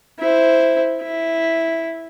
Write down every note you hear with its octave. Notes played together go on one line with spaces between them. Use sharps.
E4 C5
E4